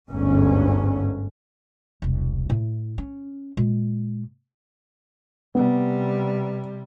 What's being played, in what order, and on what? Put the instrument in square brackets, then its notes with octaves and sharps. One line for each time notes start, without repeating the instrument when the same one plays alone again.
[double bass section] G1 D2 G#2 D3 C#4
[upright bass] E1 C2
A2 E4
C#4
A#2 G#3
[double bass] C3 G3 [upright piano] B3